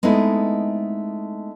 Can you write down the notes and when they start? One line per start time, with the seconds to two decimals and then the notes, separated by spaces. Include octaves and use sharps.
0.03 G#3 A3 B3 C4 D#4 E4